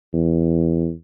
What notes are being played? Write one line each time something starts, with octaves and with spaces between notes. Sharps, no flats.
E2